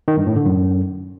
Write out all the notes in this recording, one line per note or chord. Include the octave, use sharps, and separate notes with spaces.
D#3
G2
A2
D3
F#2